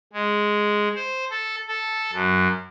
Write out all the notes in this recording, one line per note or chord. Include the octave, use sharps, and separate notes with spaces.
G#3
C5
A4
A4
F#2